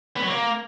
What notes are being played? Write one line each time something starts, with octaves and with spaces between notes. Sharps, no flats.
B3
F#3
A#3